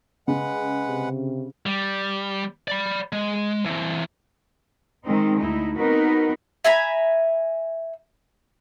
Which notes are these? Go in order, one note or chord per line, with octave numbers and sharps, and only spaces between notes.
C#3 G#3 B4 F#5
C3
G3
D5 B5
G#3
E3 C4
D#3 G#3 C4 D#4
D2 D#4 E4
B3 C4 D#4 F#4 A#4 B4
E5 G#5 A#5 B5